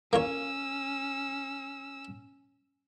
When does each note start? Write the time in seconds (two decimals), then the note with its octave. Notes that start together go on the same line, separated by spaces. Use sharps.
0.13 A#3 C#4 F4 C#5 E6